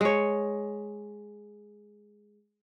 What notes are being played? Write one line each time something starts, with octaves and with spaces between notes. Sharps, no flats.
G#3 C#5